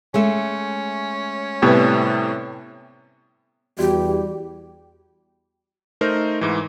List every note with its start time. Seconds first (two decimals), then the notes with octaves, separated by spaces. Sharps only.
0.14 G#3 A3 C#4 E5
1.62 A2 C3 G3 B3 B4
3.79 E2 G3 F#4 G4 D5
6.01 A3 D#4 A#4 C5
6.41 G#2 E3